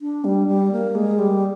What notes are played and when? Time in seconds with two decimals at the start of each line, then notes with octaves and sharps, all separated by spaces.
0.01 D4
0.25 G3
0.48 G3
0.72 A#3
0.95 G#3
1.19 G3